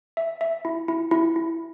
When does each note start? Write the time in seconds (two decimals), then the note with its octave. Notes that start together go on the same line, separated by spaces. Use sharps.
0.17 E5
0.41 E5
0.65 E4
0.88 E4
1.11 E4
1.36 E4